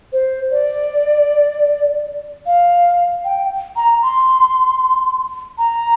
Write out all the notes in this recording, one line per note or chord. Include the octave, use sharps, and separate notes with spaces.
C5
D5
F5
G5
A#5
C6
A#5